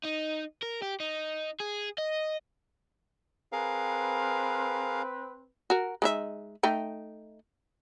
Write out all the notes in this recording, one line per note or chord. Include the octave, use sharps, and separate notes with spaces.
D#4
A#4
G4
D#4
G#4
D#5
C4 G#4 A#4 B4 F5
F#4 A#4
G#3 D#4 E5
A3 D#4 G5